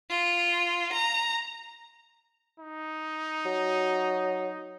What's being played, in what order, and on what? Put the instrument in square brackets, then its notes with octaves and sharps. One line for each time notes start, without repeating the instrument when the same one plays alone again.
[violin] F4
A#5
[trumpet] D#4
[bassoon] F#3